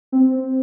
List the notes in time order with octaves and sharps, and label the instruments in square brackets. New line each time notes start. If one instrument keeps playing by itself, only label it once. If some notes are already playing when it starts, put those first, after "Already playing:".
[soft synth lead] C4